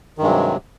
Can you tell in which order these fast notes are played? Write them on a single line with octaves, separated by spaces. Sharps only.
D#3 G2 G#3 F#3 C3